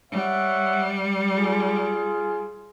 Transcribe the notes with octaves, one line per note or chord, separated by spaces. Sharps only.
G3 C#5 E5 F#5
F4 G#4